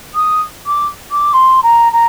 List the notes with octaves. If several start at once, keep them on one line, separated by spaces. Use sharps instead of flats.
D#6
D6
D6
C6
A#5
A#5